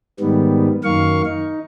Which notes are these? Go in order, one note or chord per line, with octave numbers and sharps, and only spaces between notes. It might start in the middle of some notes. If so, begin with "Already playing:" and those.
G#2 D#3 G3 B3
F#2 D#3 A#3 F5 C#6
D#4